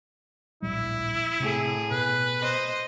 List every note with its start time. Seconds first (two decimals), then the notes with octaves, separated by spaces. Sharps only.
0.62 D1 A#1 G3 E4
1.40 A2 C3 G#4
1.91 B2 B4
2.40 C5 D#5